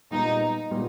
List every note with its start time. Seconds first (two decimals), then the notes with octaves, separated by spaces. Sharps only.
0.11 A#2 G3 B3 D#4
0.71 A#2 G3 B3